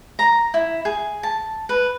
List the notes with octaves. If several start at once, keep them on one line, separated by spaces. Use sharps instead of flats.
A#5
E4
G#4
A5
B4